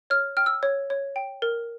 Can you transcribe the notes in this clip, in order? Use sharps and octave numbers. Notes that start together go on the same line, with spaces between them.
C#5 F6
G5 F6
E6
C#5
C#5
G5
A#4